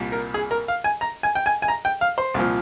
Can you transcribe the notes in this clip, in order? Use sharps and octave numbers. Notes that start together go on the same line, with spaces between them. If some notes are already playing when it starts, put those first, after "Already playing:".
Already playing: C2 A#2 G3
A#4
G#4
A#4
F5
G#5
A#5
G#5
G5
G#5
G#5
A#5
G5
F5
C5
C2 A#2 F3